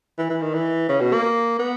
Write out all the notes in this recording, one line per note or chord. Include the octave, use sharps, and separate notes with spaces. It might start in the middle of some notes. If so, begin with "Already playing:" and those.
E3
E3
D#3
E3
C#3
B2
A#3
B3